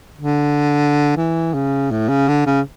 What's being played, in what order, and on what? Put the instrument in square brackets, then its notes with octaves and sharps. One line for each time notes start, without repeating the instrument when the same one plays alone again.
[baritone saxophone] D3
E3
C#3
A2
C#3
D3
C#3